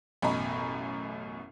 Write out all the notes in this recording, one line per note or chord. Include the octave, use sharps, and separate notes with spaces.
A1 F#2 B2 D#5 A#5 B5